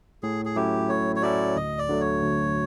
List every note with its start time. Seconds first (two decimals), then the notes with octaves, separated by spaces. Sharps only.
0.23 A2 G#4
0.45 G#4
0.56 F#3 A3 C#4 E4 G4
0.89 A2 C#5
1.16 C#5
1.22 F#3 A3 C#4 E4 D5
1.56 D2 D#5
1.78 D5
1.89 D3 F#3 A3
2.01 C#5
2.23 D2